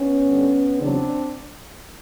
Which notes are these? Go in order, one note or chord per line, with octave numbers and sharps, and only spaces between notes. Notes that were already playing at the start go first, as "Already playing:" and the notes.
Already playing: B3 C#4
G2 D3 G3
E2 C#3 F#3 C4 D4